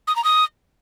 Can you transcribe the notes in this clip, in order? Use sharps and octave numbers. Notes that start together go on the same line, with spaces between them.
D#6
A#5
D#6